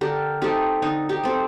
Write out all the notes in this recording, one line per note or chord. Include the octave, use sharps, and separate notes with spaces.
D3 G4 A#4
A3 C4 D#4 G4
D3 D#4
D#4 G4
A3 C4